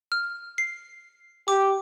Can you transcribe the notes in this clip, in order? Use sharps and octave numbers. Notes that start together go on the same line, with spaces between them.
F6
C7
G4 D6